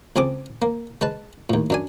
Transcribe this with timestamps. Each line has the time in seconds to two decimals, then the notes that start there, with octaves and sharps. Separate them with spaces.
0.16 C#2 C4 G#4 A4 D6
0.62 A#3
1.01 G#3 B4 A5
1.50 D#2 A2
1.70 F#2 D4 G#5